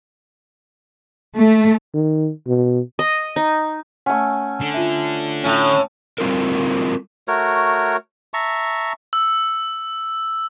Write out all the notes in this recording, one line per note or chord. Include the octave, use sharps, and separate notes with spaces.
A3
D#3
B2
D#5
D#4
A3 C#4 F#5
D3
F4 E5
A2 C#4
G3 C4 F4 A4 A#4
A3 F#4 A#4 C#5
E5 A5 A#5 C#6
E6